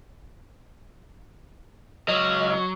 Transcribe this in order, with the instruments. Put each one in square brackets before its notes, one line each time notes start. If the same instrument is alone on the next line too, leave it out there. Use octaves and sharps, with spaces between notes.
[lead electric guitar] C#2 D#5 [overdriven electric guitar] F#3